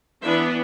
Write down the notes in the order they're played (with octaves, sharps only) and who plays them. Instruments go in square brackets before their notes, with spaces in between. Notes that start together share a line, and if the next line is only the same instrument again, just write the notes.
[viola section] E3 B3 D4 C5 E5